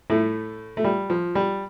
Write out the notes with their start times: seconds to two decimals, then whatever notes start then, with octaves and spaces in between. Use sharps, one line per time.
0.10 A2 A3
0.77 A3
0.84 G3
1.10 F3
1.35 G3